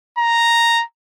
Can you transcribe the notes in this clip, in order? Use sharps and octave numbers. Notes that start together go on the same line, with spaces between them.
A#5